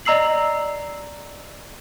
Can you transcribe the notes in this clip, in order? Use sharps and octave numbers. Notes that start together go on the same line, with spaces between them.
D5 D#5 A#5 E6 C7 F#7